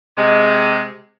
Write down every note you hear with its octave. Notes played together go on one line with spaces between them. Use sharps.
C3 G#3